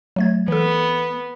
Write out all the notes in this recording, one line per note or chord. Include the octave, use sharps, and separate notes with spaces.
F#3 A3 G#6
E3 B3 A4